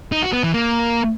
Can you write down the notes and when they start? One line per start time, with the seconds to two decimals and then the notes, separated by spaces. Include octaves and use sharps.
0.12 D#4
0.22 F#4
0.33 B3
0.43 E3
0.54 A#3